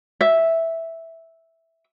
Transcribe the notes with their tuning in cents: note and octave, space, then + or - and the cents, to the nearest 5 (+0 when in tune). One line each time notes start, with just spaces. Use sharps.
E5 -5